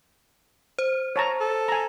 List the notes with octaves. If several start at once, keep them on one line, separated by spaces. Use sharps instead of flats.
C5
C#5 A5 A#5
A4
G#5 A#5